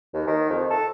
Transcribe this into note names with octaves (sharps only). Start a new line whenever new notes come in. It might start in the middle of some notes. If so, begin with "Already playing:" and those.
D#2
D#3
F2
A4